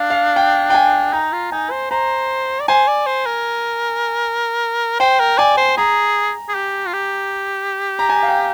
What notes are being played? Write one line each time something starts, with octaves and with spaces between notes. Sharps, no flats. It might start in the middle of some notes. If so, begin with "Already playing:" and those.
Already playing: D4 F5
F5
G5
G5
G#5
D#4 A#5
F4
D#4 G#5
C5
C5 A#5
D5
C5 G#5
D5
C5
A#4
C5 G5
A#4
D5 G#5
C5
G#4 A#5
G#4
G4
F4
G4
A#5
G#5
F5
G5